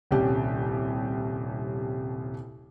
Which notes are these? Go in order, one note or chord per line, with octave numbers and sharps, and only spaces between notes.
D#1 C2 C#4 G4